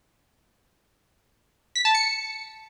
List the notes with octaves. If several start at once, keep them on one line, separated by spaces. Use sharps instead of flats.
B6
A5
C#7